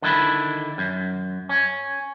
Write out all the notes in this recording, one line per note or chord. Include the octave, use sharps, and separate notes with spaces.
D3 D#3 E4 B5
F#2
C#4